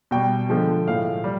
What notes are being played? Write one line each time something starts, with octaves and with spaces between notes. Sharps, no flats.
B2 G3 G5
D3 F3 G#3
A2 F3 G#3 F5
G3